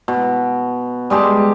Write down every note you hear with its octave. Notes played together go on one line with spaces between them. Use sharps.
B2
G3 G#3 G4 A5